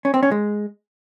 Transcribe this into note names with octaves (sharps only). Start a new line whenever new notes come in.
C#4
C4
C#4
G#3